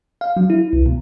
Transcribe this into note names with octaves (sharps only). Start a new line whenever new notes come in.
F5
F#3
E4
C2
B2